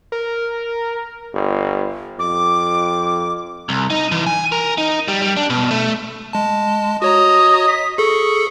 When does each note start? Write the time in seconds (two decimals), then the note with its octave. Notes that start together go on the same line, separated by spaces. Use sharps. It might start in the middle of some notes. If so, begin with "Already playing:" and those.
0.12 A#4
1.34 G1
2.19 F2 D6
3.69 C2
3.90 D#4
4.12 E3
4.27 G#5
4.52 A#4
4.78 D#4
5.08 G3
5.22 G3
5.37 D4
5.50 B2
5.71 A3
6.33 G#3 A5
7.02 F#4 C#5 D#5 A#5
7.68 B6
7.98 G#4 A4 C#6